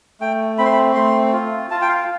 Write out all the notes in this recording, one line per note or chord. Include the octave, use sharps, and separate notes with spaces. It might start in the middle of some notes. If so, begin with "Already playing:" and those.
A3 G5
C4 B5
C6
B5
A3 C6
F4
F4 A5
G5
F5